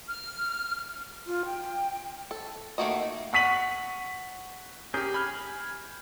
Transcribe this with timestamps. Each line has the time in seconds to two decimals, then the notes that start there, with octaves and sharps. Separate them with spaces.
0.08 F6
1.26 F4
1.45 G5
2.31 A4
2.78 D#3 A3 A#3 F#4 D#5
3.33 F#5 C#6 B6 D#7 F#7
4.94 C#4 G4 G#4 A#4 G6
5.14 G#5 B5 F6